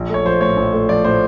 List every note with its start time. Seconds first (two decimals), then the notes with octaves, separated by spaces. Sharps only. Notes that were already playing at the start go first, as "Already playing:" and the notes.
Already playing: A#1
0.10 A3 C#5
0.25 F3 C5
0.41 A2 C#5
0.57 A#1
0.73 A3
0.89 F3 D5
1.04 A2 C5